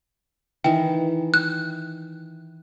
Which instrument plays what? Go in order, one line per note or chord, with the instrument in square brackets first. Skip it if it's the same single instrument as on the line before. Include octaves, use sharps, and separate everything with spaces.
[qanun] D#3 E3 [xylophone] G5
[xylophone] F#6